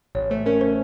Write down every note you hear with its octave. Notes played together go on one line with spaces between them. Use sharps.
A1 C#5
A3 C5
C#4 A#4
C5